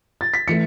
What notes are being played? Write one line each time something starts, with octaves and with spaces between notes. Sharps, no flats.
A6
B6
E3 A3 C#7